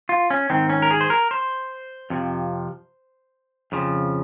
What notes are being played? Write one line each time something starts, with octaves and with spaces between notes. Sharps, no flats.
F4
C#4
G#2 D#3 C4
C#4
A#4
G#4
C5
A#4
C5
F2 C3 F3
F2 C#3 F3